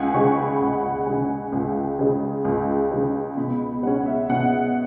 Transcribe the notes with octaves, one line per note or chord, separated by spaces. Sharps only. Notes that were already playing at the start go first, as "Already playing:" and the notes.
Already playing: C#2 F#5 G#5
C#3 G#3 C#6
B5
C#2 F#5
F#5
C#3 G#3 G#5
C#2
C#3 G#3
C#2
C#3 G#3
B2 B5
G#3 C#4 F#5
E5
B2 F#5